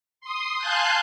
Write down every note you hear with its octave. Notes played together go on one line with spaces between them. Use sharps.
C6 D#6
F5 G#5 A5 C6 F#6 G6